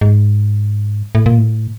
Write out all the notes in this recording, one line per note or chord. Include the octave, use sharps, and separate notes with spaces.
G#2
A2
A#2
A2